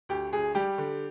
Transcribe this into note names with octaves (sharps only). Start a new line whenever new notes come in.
D2 G4
D2 G#4
G3 G4
D3